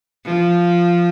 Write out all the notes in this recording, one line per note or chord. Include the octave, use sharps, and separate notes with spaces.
F3